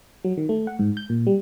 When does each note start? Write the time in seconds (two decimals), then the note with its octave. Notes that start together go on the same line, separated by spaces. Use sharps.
0.24 F#3
0.37 D#3
0.49 A3
0.67 F#5
0.79 G#2
0.97 G6
1.10 A#2
1.27 G3